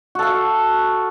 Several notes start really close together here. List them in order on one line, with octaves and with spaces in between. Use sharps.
F#4 A4 F5